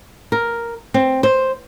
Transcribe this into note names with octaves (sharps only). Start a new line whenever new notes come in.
A#4
C4
C5